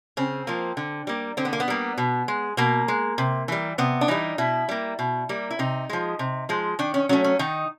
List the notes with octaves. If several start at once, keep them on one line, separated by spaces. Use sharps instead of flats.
C#3 C4
F3 A#3
D3
G3 A#3
D3 C4
B3
A#3
B3
G3 A#3
B2
G#3
B2 A#3
G#3
C3
E3 G3
C3 B3
D4
E3 G3 D#4
B2 E4
G3 A#3
B2
G3 A#3
E4
C3 D#4
F3 G#3
C3
F3 G#3
D#3 D4
C#4
F#3 A3 C#4
C#4
D#3 D#4